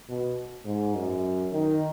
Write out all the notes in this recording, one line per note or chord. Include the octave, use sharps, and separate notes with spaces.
B2
G#2
F#2
D#3